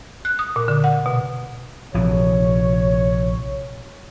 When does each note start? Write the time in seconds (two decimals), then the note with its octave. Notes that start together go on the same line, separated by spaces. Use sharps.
0.25 F#6
0.39 D#6
0.56 A#2
0.68 D3
0.84 F#5
1.06 B2
1.94 A#1 C3 E3 C#5